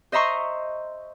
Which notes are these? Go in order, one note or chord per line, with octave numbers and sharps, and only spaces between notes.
C5 D#5 E5 A#5 C6 C#6